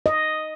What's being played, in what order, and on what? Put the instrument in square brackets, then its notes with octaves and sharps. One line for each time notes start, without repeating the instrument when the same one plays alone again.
[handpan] D#5